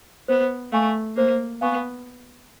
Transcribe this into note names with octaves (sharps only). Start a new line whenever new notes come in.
B3 C5
A3 F5 G#5 C#6
A#3 C5
B3 F5 G#5 C#6